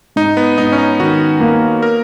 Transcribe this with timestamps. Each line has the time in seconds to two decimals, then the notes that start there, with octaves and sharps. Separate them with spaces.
0.16 G#2 D#4
0.37 B3
0.58 G#2 D#4
0.73 C#4
0.78 D#4
0.99 D#3 F#4
1.40 A#3
1.82 A#4